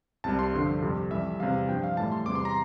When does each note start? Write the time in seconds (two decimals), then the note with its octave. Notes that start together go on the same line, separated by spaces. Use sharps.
0.24 C2 C3 G3 A5
0.39 C6
0.53 G2 D3 F3
0.82 F2 C3 G3
1.11 F2 E3 G3 E5
1.40 E2 C3 G3 F5
1.68 G2 F3 G5
1.84 F5
1.97 A2 E3 G3 A5
2.12 C6
2.26 E2 C3 G3 D6
2.35 C6
2.45 A#5